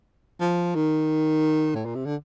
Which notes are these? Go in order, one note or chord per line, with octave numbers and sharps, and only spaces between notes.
F3
D#3
A2
A#2
C3
D3